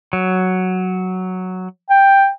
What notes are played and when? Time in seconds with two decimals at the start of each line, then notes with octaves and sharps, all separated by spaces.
0.13 F#3
1.90 G5